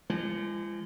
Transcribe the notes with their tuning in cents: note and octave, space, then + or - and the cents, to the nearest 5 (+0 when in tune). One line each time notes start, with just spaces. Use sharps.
F3 -40 G#3 -30